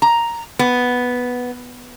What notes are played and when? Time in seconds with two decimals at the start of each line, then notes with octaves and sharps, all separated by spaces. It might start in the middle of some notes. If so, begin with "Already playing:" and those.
0.02 A#5
0.59 B3